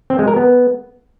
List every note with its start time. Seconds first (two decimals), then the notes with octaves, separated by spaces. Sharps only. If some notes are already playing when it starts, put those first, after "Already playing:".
0.10 C4
0.19 G#3
0.28 A#4
0.36 B3